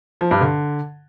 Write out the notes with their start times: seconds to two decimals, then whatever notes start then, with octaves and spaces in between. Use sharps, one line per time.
0.21 F3
0.31 G2
0.41 D3